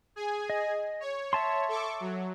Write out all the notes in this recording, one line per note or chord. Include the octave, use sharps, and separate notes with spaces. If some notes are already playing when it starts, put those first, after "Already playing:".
G#4 G#5
D#5
C#5
E5 A5 C6
A4 C#6 D6
F#3